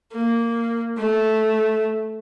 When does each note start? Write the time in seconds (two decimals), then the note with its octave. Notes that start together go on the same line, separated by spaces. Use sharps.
0.13 A#3
0.98 A3